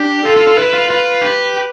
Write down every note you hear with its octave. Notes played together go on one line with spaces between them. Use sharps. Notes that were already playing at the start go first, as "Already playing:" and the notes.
Already playing: D4 G4
F4 A4
F4
F4
E4 B4
F4
F4 B4
G4